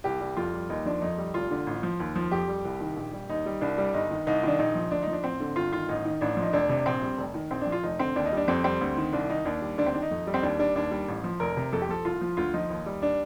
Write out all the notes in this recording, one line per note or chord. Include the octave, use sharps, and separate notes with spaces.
C2 G4
G3
F2 F4
G3
D#2 D#4
F3 D4
F2 D#4
G3
F1 F4
D3
A1
F3
D#2
F3
F2 G4
G3
C2
D#3
A#1
G3
D#2 D#4
G3
C2 D4
G3
G1 D#4
D#3
C2 D#4
D#3 D4
A#1 D#4
F3
D2 D4
F3 D#4
D4
A1 C4
D3
G1 F4
D#3 F4
A1 D#4
D#3
A1 D4
F3
D#4
F1 D4
C3
A#1 C4
G3
F1
D#3
A#1 C4
F3 D4
F4
F1 D#4
D3 C4
D#2 D4
D#4
G3 D4
F2 C4
G3 C4
D2
D#3
C2 D4
D#3 D#4
D#2 D4
G3
D2 D4
C4
D#3 D4
D#4
F2
G3
C4
D#2 D4
G3 D4
D#2 D4
G3
A1
F3
F1 A#4
C3
F2 A4
G4
F3 A4
C2 F4
F3
D2 F4
F3 D#4
D#2
G3
D4